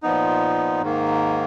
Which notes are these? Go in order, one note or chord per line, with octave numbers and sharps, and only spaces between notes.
A#2 F3 B3 D#4
G#2 D#3 A#3